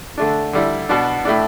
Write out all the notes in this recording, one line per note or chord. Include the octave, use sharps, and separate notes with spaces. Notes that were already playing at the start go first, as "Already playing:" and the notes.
D3 A3 D4
D3 G3 E4
B2 B3 D4
A2 A3 D4